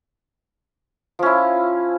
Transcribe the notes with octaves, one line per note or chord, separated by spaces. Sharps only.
F3 C#4 E4